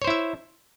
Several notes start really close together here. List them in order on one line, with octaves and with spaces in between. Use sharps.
C#5 C5 E4 E5